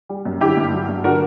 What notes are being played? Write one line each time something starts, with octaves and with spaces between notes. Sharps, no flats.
G3
F#2
D3 E4 G4
G2
F#3
G2
D3 F#4 A#4